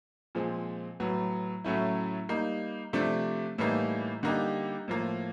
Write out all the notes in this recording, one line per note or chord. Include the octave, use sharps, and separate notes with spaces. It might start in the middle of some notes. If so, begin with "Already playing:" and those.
A#2 F3 G#3 C4
A2 F#3 B3
A2 F#3 A3 C#4 E4
G3 A#3 D#4
C3 F3 A3 D4
A2 E3 G3 A#3 D#4
D3 G3 A#3 D#4 G4
A2 F3 A#3